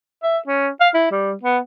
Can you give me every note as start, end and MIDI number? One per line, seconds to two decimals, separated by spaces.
0.23 0.38 76
0.47 0.69 61
0.81 0.89 77
0.94 1.09 64
1.11 1.33 55
1.43 1.59 59